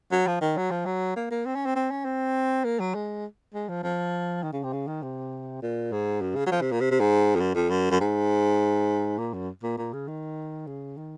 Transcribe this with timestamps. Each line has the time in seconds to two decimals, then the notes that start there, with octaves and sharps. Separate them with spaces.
0.12 F#3
0.27 F3
0.41 D#3
0.57 F#3
0.71 F3
0.86 F#3
1.16 A#3
1.31 A#3
1.46 C4
1.55 C#4
1.65 C4
1.76 C4
1.91 C#4
2.05 C4
2.64 A#3
2.80 F#3
2.94 G#3
3.54 G#3
3.69 F3
3.83 F3
4.43 D#3
4.53 C#3
4.63 C3
4.73 C#3
4.87 D#3
5.02 C3
5.62 A#2
5.92 G#2
6.21 F#2
6.36 C#3
6.46 F#3
6.51 F3
6.61 C3
6.71 A#2
6.81 C3
6.91 C3
7.00 G#2
7.35 F2
7.40 F#2
7.55 F2
7.70 F#2
7.91 F#2
8.00 G#2
9.18 A#2
9.34 F#2
9.63 A#2
9.78 A#2
9.93 C#3
10.08 D#3
10.67 C#3
10.97 D#3